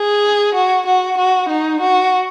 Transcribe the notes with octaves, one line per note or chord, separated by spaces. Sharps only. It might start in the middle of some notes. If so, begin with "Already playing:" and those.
Already playing: G#4
F#4
F#4
F#4
D#4
F#4